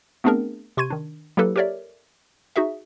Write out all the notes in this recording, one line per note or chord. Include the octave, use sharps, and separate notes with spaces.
A3 B3 C4 D4 G#4 A#4
C3 C6 C#6 G#6 D#7
D#3 D4
F#3 A#3 E4 G4 A4 B4
G4 A4 A#4 C#5 D5 E5
D#4 F#4 G#4 E5